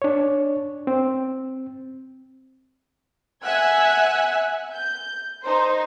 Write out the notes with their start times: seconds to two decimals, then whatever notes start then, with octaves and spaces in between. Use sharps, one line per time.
0.02 D4 C#5
0.87 C4
3.43 E5 F#5 G#5 E6 F#6 G#6
4.73 G6
5.44 D#4 C5